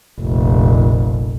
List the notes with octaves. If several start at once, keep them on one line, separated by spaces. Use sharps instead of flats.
F1 A#1